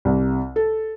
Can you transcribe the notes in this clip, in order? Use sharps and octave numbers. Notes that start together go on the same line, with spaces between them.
C2
A4